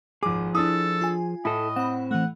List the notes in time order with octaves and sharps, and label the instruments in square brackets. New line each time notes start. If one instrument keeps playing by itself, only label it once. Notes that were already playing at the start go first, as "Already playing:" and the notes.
[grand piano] G#1 D6 [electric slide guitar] F3 G#4
[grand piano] D4 D#6 [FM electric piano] E4 [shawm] A4
[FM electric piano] F4 G#5
[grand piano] A2 [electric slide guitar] E4 A4 [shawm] D#5
[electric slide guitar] C4 [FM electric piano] F#5 B5
[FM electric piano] E3 A3 [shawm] F#5